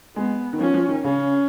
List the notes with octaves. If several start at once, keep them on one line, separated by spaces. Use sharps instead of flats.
G#3 B3
D#3
F3 C#4
F3
D#3
C#3 C#4